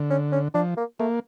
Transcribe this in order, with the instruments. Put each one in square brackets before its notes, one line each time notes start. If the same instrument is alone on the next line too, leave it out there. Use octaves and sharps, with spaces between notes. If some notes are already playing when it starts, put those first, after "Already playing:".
Already playing: [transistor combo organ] D3
[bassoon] C#4
C#4
[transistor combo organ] F3 [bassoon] D4
[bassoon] A#3
[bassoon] A3 [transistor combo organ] A#3